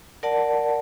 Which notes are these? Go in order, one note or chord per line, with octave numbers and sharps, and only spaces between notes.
A#4 D5 F#5 A5